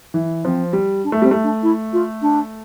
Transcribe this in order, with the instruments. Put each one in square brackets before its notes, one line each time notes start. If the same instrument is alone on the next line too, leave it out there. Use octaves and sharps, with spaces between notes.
[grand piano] E3
[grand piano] F3 [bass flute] C4
[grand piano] G3
[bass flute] D4
[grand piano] A3
[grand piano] G3 [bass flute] C4
[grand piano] A3
[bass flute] D4
E4
F4
D4